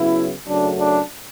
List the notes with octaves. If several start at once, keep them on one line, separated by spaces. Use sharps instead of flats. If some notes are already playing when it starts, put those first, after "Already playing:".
Already playing: C#3 F#3 B3 E4
F#2 C#3 F#3 A3 D4
D4